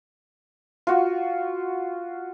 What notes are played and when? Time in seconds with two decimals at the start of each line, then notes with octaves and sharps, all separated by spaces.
0.87 F4 F#4